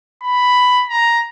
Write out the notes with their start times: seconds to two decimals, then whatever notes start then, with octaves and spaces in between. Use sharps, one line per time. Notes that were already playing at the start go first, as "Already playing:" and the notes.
0.23 B5
0.90 A#5